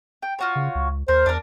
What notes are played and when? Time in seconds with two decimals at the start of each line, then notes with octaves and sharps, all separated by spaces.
0.22 G5
0.39 F4 F#4 C#5
0.55 C#3
0.75 C#2
1.08 D#2 A#4 C5
1.26 E2 D4 A#4